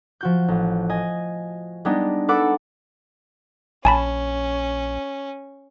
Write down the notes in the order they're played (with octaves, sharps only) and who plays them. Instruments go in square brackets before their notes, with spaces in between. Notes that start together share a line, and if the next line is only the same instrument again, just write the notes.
[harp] F3 F#4 G6
A1
D#5 G#5
G3 G#3 B3 D4 D#4
A4 B4 F#5 B5 D6 E6
[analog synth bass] A#1 [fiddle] C#4 [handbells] G#5 A5 B5